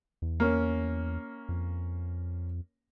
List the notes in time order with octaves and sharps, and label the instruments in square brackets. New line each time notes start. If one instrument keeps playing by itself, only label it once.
[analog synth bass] E2
[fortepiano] A#3 C#4
[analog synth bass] F2